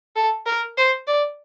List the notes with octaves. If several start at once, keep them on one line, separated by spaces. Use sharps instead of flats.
A4
A#4
C5
D5